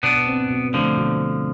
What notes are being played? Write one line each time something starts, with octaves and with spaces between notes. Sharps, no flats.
B2 B3 D4
C4
B2
D3 F3 A3
B2